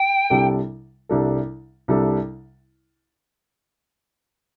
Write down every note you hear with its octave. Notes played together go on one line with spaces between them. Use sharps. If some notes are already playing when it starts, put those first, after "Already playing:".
Already playing: G5
C2 C3 G3 D4 A4
C2 C3 G3 D4 A4
C2 C3 G3 D4 A4